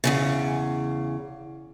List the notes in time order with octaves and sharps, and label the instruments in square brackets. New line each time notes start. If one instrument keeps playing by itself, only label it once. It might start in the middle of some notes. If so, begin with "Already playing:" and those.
[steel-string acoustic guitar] E2 G#2 C#3